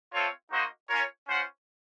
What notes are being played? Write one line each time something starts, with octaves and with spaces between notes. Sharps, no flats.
A3 C4 F4 A4 C#5
A#3 D#4 F#4 C5 D#5
C#4 F4 A#4 C#5
C#4 F4 C5 F#5